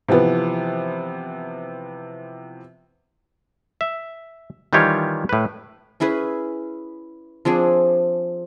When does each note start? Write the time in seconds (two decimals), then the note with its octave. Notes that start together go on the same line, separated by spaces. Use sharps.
0.08 C3 E3 F3 B3
3.81 E5
4.73 D#3 E3 G3 F4 G4 C#5
5.29 A2 B4
6.00 C#4 E4 G#4 B4
7.45 F3 C4 D4 G#4